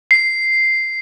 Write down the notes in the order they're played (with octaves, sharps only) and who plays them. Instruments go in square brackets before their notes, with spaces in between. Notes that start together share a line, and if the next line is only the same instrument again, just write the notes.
[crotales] C7